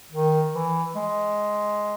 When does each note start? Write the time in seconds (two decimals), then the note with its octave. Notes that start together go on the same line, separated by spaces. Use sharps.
0.12 D#3
0.54 E3
0.95 G#3